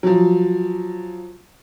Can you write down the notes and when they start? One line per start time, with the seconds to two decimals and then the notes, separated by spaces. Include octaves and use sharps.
0.03 F3 F#3